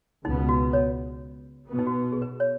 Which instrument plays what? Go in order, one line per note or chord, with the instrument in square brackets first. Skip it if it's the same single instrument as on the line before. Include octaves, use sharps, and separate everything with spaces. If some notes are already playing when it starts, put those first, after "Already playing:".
[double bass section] C#2 B2 B3 [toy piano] D#4
[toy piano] F#4
C#5
[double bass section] B2 B3
[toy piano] D#4
F#4
G#4
B4
C#5